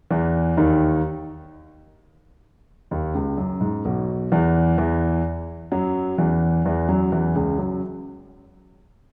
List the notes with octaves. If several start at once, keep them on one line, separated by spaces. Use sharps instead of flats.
E2 E3
D#2 D#3
D#2 D#3
C#2 C#3
F#2
G#2
B1 B2
E2 E3
E2 E3
F#2 F#3
E2 E3
E2 E3
F#2 F#3
E2 E3
C#2 C#3
F#2 F#3